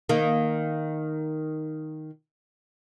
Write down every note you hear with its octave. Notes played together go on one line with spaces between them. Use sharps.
D#3 A#3